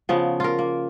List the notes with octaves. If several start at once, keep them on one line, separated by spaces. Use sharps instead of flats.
C#3 F3 B3
F4 A#4
A#3